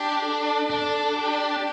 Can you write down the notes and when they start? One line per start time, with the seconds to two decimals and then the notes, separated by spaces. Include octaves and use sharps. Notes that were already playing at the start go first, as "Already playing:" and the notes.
Already playing: D4 G4
0.23 A4
0.70 D4
1.18 G4